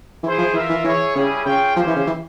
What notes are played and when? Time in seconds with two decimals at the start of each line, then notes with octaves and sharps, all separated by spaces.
0.23 E3 E4 G#4 C5
0.38 F3
0.53 E3 F4 A#4 E5
0.69 E3
0.84 E3 E4 G#4 C#5
1.15 C#3 G3 C#4 E4 G#4
1.45 C#3 F4 G#4 C#5 G5
1.76 F3 A#3 C#4 G4 C5
1.87 E3
1.97 C#3
2.07 E3